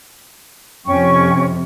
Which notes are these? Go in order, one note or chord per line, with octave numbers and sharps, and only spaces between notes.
F2 C3 C#4 G5 C#6